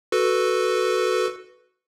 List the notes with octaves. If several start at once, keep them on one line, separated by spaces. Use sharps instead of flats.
F#4 A4 B4